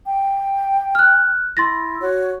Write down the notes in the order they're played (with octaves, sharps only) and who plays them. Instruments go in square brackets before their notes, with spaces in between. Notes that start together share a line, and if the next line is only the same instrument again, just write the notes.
[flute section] G5
[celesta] F6 F#6
[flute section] E4 [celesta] C6 A6 A#6
[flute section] F#4 C#5